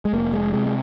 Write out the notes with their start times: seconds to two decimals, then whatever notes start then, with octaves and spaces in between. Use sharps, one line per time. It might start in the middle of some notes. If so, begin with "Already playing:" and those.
0.05 G#3
0.13 F1 A#3
0.33 G#3
0.53 C3 G#3
0.66 G#3